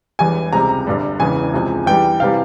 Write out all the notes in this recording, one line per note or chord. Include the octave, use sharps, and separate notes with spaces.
E1 E2 E3 G3 G#5
C#2 C3 G3 A#5
G1 G2 G3
E1 E2 C#3 E3 G#5
C#2 C3 F3
E2 E3 G3 G5
C3 E3 G3 F5